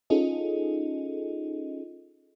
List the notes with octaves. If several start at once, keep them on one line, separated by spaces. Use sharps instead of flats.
C#4 D#4 F4 G#4 A4 D#5